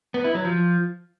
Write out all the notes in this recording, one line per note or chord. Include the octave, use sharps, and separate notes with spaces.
B3
E4
F#3
F3